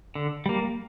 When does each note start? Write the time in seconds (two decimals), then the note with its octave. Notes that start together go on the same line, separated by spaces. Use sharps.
0.15 D3
0.46 G3 A#3